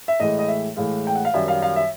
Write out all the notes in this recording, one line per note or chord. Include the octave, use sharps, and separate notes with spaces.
E5
A2 E3 G#3 D#5
D#5
E5
A2 E3 G#3 F5
G5
F#5
F5
F#2 D#3 G3 E5
F5
F5
E5